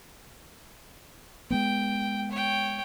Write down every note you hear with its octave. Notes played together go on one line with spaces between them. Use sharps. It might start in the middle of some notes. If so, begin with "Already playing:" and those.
G#3 A3 B3 G5
C#5 G5